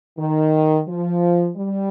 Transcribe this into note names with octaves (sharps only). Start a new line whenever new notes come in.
D#3
F3
G3